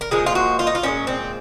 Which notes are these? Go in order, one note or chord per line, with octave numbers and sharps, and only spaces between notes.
A#4
A#2 F3 G#3 G#4
F4
F#4
F4
D#4
F4
A#2 F3 G#3 C#4
C4